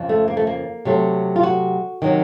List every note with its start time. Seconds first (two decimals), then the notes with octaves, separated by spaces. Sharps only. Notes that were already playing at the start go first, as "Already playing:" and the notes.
Already playing: F2 C#3 F3
0.09 A3
0.28 A#3
0.37 A3
0.47 A#3
0.85 C3 F#3 A3
1.36 F4
1.43 F#4
2.02 C3 D#3 F#3